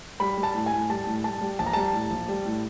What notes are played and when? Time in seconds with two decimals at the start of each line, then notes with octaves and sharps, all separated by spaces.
0.20 G3 B5
0.38 G3
0.43 A5
0.55 A2
0.66 G#5
0.73 A2
0.90 G3 A5
1.07 A2
1.24 G3 A5
1.41 G3
1.59 A#1 A5
1.66 A#5
1.73 G3 A5
1.93 A2
2.11 A#1
2.28 G3
2.45 A2